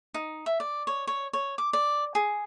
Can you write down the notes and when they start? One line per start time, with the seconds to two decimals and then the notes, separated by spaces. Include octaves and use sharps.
0.14 D#4
0.46 E5
0.60 D5
0.87 C#5
1.07 C#5
1.33 C#5
1.58 D6
1.73 D5
2.15 G#4